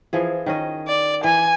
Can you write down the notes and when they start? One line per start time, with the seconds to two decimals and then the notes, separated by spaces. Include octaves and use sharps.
0.13 E3 F3 G#4
0.46 D#3 C#4 D#5
0.88 D5
1.24 E3 G#5